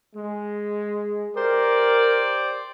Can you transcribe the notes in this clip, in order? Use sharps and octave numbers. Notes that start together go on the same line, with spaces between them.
G#3
G4 A#4 C5 D5